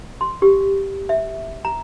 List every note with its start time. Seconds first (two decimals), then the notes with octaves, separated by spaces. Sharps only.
0.21 C6
0.42 G4
1.09 E5
1.65 A#5